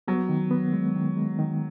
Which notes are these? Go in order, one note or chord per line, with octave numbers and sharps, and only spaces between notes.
F#3 B3
D#3
B3
G#3
D#3
G#3
D#3